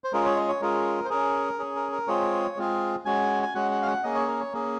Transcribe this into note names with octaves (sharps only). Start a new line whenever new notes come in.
C5
G#3 C#4 F4 G#4 A#4
C#5
D#5
C#5
G#3 C#4 F4 G#4 A#4
C5
C#4 G#4 A#4
C#4 G#4
A#4
A#4
G#3 C4 F4 G#4 C#5
G#3 C4 F4 G#4
G#3 C#4 F#4 G#5
G#5
G#3 C#4 F#4 F#5
F#5
F5
F#5
A#3 C#4 G#4 D#5
C#5
A#4
C#5
A#3 C#4 G#4